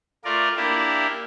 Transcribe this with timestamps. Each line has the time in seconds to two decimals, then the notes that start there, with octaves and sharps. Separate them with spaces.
0.25 A3 F4 A#4 D5
0.56 A#3 D4 E4 G4